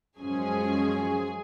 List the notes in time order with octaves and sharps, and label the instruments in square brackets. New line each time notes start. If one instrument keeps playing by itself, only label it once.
[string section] F#2 F3 G#3 C#4 G#4 G#5